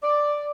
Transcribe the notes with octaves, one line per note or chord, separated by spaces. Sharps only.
D5